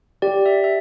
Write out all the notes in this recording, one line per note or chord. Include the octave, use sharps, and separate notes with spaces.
G4 D5
E5
E5